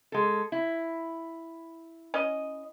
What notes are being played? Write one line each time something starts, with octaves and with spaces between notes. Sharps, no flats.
G#3 A4
E4
C#4 D#5